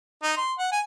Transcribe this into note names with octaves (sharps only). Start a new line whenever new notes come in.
D#4
C6
F#5
G#5